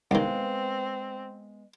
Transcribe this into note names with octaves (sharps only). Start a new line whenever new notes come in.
C2 D#3 G#3 B3 C4 F5